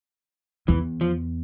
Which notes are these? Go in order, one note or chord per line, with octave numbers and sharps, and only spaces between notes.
E2 E3
F3